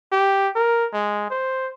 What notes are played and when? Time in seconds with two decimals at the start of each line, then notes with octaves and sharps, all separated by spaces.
0.12 G4
0.56 A#4
0.93 G#3
1.30 C5